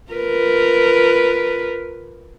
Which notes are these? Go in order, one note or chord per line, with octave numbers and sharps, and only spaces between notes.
F4 A#4 B4